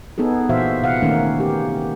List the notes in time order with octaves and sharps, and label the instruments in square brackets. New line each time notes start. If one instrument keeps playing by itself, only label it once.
[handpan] B3 D#4 G#4 A4
A#2 E3 F#4 C5 E5 F5
C3 F5 F#5
D#3 A3 A#3 C#4 D#4
G4